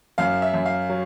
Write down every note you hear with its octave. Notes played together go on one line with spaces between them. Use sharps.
F#2 F5
E5
F#2
F5
F#3